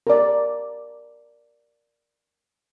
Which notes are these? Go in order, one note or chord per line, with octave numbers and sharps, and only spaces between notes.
A#4 D5